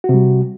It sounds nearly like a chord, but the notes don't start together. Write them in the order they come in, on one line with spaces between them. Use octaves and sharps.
F#4 C3 G3